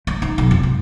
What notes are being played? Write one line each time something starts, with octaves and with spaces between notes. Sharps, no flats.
A3
D#4
B1
F1
G#2